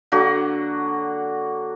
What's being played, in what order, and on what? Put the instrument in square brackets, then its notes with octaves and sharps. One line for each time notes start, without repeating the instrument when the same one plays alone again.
[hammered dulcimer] D3 F#3 A#3 F#4